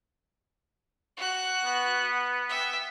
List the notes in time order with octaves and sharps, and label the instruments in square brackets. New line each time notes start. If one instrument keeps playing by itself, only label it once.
[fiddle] F#4 F#6
[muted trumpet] B3
[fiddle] E5 G5